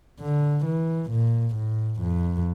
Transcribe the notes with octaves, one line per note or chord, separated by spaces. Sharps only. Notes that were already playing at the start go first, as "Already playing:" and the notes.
D3
E3
A#2
A2
F2